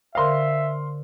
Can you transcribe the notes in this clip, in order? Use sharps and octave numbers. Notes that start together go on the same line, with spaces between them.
D3 A#4 C5 E5 F5 C6